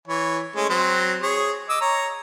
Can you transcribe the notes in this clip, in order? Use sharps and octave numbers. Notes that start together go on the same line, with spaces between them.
E3 C#5
G#3 A3 C#4
F#3 C4 C5
G#4 C#5
D#5 D6 E6
C#5 A#5